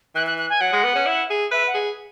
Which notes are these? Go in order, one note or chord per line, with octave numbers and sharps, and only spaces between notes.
E3 F#6
F#6
F#6
G#5
F#3 F#5
G#3
B3
C#4
E4
G#4
B4 E5
F#5
G#4